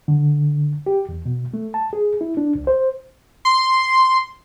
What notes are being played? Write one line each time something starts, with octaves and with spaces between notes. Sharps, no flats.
D3
G4
E2
B2
A3
A5
G#4
E4
D4
C#2
C5
C6